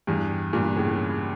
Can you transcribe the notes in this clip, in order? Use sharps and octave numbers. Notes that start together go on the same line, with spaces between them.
E2 G2
G2 A#2
A2 C#3